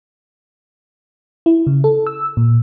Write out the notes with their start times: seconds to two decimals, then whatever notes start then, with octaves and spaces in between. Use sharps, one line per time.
1.46 E4
1.67 C#3
1.84 A4
2.07 E6
2.37 A#2